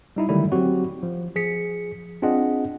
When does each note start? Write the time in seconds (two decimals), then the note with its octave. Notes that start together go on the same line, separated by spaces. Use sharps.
0.16 G3 D#4 E4
0.29 D3 D#3 F#3 G3 A3 E4
0.52 F#3 C4 F#4 G4
1.03 F3
1.35 F3 G#4 B6 C#7
2.22 C4 D4 F4 G#4 D#5 F#5